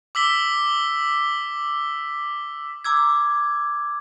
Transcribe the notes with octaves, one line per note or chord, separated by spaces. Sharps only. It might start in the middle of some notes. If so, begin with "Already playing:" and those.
D6 E6 B6 G7
A#5 D6 E6 G#6